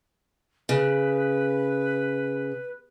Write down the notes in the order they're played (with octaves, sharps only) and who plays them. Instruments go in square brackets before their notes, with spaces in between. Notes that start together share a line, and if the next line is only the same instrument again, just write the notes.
[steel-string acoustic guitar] C#3 [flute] B4